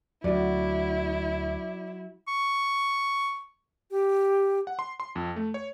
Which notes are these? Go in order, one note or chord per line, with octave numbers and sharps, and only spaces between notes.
D2 F#3 E4 F#4 D5
C#6
G4
F#5
C6
C6
F2
A3
C#5